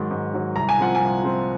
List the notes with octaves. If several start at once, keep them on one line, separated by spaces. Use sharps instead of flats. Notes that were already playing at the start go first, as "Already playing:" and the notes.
Already playing: G#2 D#3 F#3
G#2
D#3 F#3
C2 A#5
G#5
A#2 F3 C4 F4 F#5
G#5
C2
A#2 F3 C4 F4